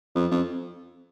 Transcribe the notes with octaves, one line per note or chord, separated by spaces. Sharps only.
F2
F2